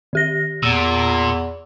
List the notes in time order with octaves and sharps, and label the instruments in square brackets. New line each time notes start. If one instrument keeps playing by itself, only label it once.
[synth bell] D#3 G4 A#6
[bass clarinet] E2 [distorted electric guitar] A#2 [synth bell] E6